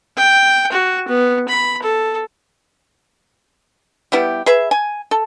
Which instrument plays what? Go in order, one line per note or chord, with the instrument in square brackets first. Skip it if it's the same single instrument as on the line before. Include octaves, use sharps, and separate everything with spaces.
[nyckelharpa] G5
F#4
B3
B5
A4
[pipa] G3 B3 E4 G4
G#4 B4 E5
G#5
A4